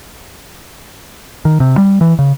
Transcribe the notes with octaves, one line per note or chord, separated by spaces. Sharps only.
D#3
C3
G3
E3
C#3